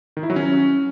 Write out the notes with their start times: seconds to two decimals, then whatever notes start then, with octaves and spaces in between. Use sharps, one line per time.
0.17 D#3
0.23 E4
0.30 F#3
0.36 C#4